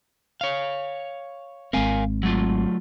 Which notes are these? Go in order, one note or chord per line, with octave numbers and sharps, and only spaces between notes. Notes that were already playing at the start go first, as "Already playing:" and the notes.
C#5 F5
G#1 G#3 C4 A#4 F5 G#5
F#3 A3 F4